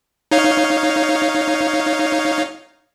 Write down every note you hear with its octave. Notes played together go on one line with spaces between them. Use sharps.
D#4 C#5 F5